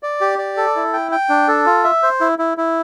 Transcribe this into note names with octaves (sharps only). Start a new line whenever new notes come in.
D5
G4
D5
A4
E4
G5
G5
D4
A4
F4
E5
C5
E4
E4
E4